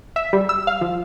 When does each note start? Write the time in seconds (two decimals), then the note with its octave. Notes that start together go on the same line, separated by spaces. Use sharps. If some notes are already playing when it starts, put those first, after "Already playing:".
0.16 E5
0.33 G3
0.49 E6
0.67 F5
0.81 F3